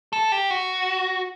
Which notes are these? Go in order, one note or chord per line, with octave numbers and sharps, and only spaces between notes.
A4
G4
F#4